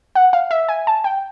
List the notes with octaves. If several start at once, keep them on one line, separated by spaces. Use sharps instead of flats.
F#5
F5
E5
G#5
A5
G5